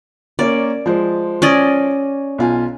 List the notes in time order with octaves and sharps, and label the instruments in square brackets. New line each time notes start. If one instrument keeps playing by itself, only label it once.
[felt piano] A#3 C#4 [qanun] D5
[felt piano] F3 G#3 C5
[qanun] C#4 D5 D#5
[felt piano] B1 F4 G#5